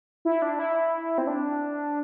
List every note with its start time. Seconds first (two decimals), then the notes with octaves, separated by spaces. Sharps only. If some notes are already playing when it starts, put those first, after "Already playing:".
0.25 E4
0.42 D4
0.59 E4
1.18 C4
1.27 D4